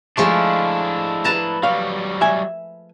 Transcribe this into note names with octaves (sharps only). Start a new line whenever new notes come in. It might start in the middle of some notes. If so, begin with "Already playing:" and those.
F3 G#3 A3 D4 E4
B4 A5 A#5
F#3 G3 F5
E5 G#5